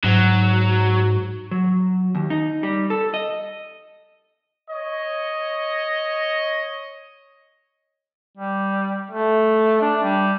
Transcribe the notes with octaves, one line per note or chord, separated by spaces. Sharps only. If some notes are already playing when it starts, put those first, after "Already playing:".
G#2 F#3
F#3
D#2
D#4
G3
A4
D#5
C#5 D#5
G3
A3
D4
G3